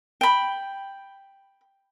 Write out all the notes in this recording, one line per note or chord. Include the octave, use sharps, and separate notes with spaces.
G5 B5